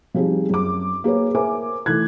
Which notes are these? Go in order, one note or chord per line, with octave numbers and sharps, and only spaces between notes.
F3 G3 C4 D#4 G#4
F#2 D6
A#3 G#4 B4 C#5
A#4 C5 E5 G#5 D6
E3 A3 F#6 G#6